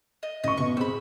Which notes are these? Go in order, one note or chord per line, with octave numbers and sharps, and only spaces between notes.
D#5
A1 D#5 C#6
A1 B2 C#6
C4 G#4 B5 E6